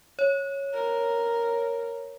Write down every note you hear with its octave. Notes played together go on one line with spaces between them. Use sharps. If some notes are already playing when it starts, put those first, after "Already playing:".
C#5
A#4